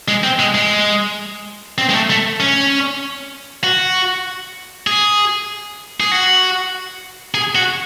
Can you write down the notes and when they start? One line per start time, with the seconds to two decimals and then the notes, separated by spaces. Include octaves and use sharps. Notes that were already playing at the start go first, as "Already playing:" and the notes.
0.08 G#3
0.24 C4
0.40 G#3
0.55 G#3
1.78 C4
1.89 G#3
1.93 A3
2.10 A3
2.40 C#4
3.64 F#4
4.87 G#4
6.00 G#4
6.12 F#4
7.34 G#4
7.55 F#4